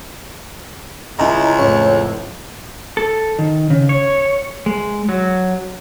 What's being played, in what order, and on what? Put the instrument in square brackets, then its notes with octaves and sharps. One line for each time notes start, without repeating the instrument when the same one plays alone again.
[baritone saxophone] C#2 [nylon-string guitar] C#4 E4 [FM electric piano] D#5 A#5
[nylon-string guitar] F2 A2 C#4 [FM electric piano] C#5
[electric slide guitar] A4
D#3
C#3
C#5
G#3
F#3